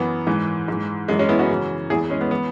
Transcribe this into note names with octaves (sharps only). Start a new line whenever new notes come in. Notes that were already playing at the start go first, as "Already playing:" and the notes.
Already playing: F#2 E3 B3
G#2 E3
G#2 E3
F#2 E3 G#3
G#3 C#4
B3 E4
C#4 F#4
F#2 C#3 E3
E2 E3 E4 G#4
G#3 C#4
B3
E3 B3